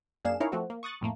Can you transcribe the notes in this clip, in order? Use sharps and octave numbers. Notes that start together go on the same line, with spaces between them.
F#2 A#3 D4 G#4 F5 E7
C#4 D#4 E4 A#4 C#5 F5
F3 A3 C4 F#4
A#3
C#6 D#6 F#6 A6
F2 A2 A3 A#3